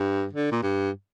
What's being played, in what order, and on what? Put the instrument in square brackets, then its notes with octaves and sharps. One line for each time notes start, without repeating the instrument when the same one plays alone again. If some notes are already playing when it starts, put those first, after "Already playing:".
Already playing: [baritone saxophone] G2
D3
A#2
G2